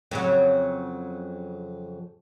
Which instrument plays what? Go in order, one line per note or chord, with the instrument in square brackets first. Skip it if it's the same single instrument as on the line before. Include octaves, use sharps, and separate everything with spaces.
[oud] F2 C#3 F#3